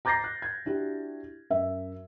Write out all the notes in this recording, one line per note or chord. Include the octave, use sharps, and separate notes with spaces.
A#5 D6 G6 A6 A#6 C7
F#6
G#6
D4 E4 F#4 G4
F#2 E5